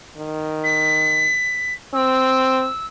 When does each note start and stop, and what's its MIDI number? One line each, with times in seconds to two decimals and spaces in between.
0.17 1.36 51
0.64 1.74 95
1.94 2.67 60
1.94 2.86 88